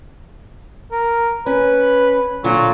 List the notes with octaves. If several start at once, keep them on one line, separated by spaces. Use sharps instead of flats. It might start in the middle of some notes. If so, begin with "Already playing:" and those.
A#4
C#4 B4
A#2 D3 F#3 F4